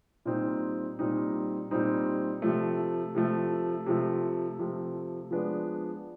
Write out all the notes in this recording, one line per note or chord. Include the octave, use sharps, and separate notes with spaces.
A#2 G3 C4 D#4
A#2 G3 C4 D#4
A#2 G3 C4 D#4
C3 F3 A3
C3 F3 A3
C3 F3 A3
C3 F3 A3
F3 G#3 B3 D4